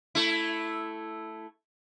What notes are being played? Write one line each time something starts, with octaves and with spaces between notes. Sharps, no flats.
A3 E4